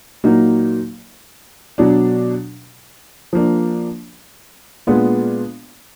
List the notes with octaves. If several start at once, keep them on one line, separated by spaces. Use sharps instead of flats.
A#2 F#3 A#3 D#4
B2 F#3 D4
F3 A#3 D4
A#2 G#3 B3 D4 F4